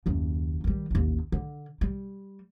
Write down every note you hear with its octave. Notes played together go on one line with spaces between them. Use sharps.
F#1 D#2
D#3 G3
A1 D#2
D3
G3